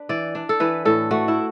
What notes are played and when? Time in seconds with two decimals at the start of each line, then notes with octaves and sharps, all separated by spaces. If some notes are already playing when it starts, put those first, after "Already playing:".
Already playing: D4 B4
0.09 E3 D5
0.35 D4
0.49 A4
0.60 E3 B4
0.85 A2 A4
1.11 A3 F#4
1.28 E4